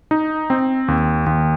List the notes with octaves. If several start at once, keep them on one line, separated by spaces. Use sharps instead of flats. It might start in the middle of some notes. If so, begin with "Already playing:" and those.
D#4
C4
D#2
D#2